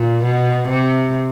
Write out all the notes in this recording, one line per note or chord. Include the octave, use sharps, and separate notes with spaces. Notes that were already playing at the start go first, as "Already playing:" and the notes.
Already playing: A#2
B2
C3